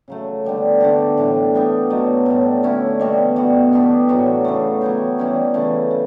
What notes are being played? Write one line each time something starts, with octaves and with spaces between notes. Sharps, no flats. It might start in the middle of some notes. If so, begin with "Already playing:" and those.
C#3 F#3 A3
D3 G3 B3
D3 A3 D4 G4
A2 E3 G3 D4
G3 B3 D4 G4
B2 F#3 A3
A2 G3 D4
D3 A3 C#4 E4
B2 G3 B3 F#4
G3 B3 F#4
E3 B3 D4 G4
A2 F#3 B3 F#4
C#3 E3 A3
F#3 B3 E4 G4
E3 G3 C#4
C#3 E3 A3
C#3